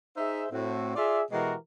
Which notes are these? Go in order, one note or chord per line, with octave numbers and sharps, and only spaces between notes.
D#4 G#4 C5 E5
A2 C4 F#4
F4 G#4 D5 E5
B2 E3 G#3 F#4 G4 A#4